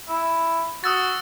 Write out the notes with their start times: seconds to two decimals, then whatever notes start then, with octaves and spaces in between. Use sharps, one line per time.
0.09 E4
0.84 F#4 D#6 E6 A6